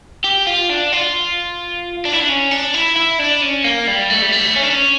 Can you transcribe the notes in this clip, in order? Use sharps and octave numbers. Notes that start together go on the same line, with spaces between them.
G4
F4
D4
F4
D4
E4
D4
C#4
D4
E4
E4
D4
C#4
A#3
G3
A3
G3
A3
C#4
D4
C#4